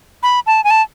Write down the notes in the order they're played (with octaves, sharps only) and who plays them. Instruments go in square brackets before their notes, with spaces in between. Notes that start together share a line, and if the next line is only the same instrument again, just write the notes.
[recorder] B5
A5
G#5
A5